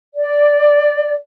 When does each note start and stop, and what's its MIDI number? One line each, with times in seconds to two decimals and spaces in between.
0.14 1.15 74